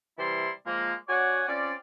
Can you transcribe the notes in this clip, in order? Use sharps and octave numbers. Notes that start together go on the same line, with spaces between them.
C3 E3 G3 E4 D5 C6
F3 G#3 A#3
C#4 F#4 C#5 D5 F#5 G#5
C4 C#4 F4 D5